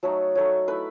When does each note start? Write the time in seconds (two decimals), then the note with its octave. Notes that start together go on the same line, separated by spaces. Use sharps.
0.03 F#3 A3 D#4 A4
0.35 F#3 A3 D#4
0.68 A3 E4 B4